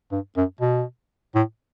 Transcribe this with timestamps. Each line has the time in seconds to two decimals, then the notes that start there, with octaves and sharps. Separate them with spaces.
0.12 G2
0.37 F#2
0.61 B2
1.35 A2